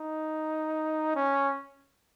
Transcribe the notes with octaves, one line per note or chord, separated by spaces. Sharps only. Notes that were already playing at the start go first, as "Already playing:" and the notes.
Already playing: D#4
C#4